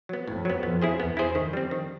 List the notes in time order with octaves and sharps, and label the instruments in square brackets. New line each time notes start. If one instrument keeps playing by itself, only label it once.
[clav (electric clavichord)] F#3 B3
[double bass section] F2 [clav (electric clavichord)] A2
[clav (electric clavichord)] F#3 B3
[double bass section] F2 [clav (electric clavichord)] B3
[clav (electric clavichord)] E4 G#4 C5
[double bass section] E2 [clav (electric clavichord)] B3
[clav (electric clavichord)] E4 G#4 C5
[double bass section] F2 [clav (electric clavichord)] D#3
[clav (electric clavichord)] G3 C4
D#3